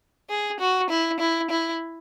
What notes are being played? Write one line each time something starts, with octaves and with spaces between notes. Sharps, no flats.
G#4
F#4
E4
E4
E4